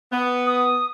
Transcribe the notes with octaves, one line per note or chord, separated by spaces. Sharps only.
B3
D#6